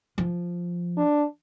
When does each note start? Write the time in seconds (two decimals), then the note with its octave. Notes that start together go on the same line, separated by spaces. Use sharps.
0.18 F3
0.97 D4